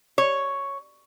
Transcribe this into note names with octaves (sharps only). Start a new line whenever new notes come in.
C#5